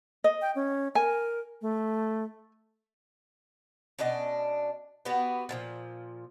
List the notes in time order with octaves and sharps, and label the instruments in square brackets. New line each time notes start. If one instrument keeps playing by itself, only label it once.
[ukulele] D#5
[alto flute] G5
C#4
[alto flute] A#4 [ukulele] G#5
[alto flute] A3
[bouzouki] B2 C#4 D4 D#5
B3 F#4 G4 B4
A#2 E3 F3